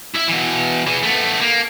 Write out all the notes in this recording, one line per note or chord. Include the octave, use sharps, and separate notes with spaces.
E4 E5
B2 E3
E3 G#4
A3 B3
A#3